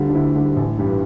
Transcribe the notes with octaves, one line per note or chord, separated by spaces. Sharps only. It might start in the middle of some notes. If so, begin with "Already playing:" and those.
Already playing: D2 D3 G3 F4
D4
D2 E4
D3 G3
A1
G2 E3 G3